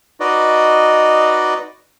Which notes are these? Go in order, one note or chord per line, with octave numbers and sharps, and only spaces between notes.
D#4 F#4 B4 D5 D#5